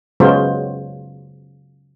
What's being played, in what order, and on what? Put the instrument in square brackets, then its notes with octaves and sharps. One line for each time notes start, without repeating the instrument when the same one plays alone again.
[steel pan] C#3 F#3 G#3 B3 F4 C5